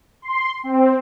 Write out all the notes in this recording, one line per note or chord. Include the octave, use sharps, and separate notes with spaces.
C6
C4